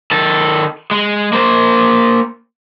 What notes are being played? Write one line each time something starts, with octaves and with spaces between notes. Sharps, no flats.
D#3 A4
G#3
A#3 C5